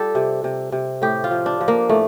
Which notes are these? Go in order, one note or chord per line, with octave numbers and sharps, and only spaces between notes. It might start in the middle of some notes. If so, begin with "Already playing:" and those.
Already playing: G3 F4 G4 A4
C3
C3
C3
A2 G4
F4
F3
D4
F3
A#3
A2 A3